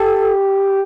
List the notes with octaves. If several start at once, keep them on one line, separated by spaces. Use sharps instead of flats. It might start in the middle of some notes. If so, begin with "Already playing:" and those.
Already playing: G4 A4